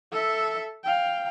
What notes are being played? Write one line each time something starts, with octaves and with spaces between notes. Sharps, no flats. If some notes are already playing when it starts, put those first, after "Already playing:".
A4 E5
F5 G5